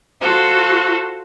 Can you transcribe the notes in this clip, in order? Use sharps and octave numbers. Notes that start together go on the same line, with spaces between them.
F4 F#4 A4 C5